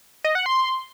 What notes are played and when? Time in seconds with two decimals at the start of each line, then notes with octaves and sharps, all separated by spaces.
0.24 D#5
0.35 F#5
0.46 C6